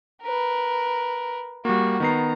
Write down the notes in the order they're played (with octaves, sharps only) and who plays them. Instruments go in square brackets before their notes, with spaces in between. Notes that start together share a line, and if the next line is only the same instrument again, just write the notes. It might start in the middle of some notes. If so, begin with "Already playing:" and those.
[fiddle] A#4 B4
[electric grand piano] G3 A#3 [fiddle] F#4
[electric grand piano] D#3 B3 C7 [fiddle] A#5